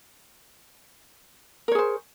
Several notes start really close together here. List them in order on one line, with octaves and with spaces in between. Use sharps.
A#4 C#5 G#4 C5